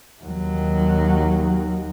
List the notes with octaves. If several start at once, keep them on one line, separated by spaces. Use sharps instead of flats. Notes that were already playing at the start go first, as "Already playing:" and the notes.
D#2 F#3